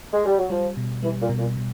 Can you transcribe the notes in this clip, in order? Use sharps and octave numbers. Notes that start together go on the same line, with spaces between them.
G#3
G3
F#3
F3 G3
B2
E3 G3
A#2
B2
A#2
B2